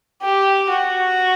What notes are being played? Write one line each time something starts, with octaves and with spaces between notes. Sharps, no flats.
G4
F#4